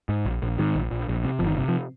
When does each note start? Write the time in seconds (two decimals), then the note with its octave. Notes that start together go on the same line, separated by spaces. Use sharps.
0.09 G#2
0.25 A#1
0.42 A#1
0.59 G#2 D#3
0.75 A#1
0.91 A#1
1.08 A#1
1.24 C3
1.39 G1 F3
1.46 D#3
1.57 C3
1.68 F3